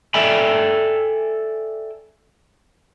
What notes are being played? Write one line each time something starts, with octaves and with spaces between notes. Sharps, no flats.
A4 D5 E5 G5 G#5 B5